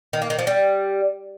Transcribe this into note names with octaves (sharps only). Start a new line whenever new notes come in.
D#3
A#3
D#3
F3
G3